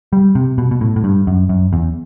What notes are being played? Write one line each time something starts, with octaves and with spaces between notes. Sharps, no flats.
G3
C3
B2
B2
A2
A2
G2
F#2
F#2
E2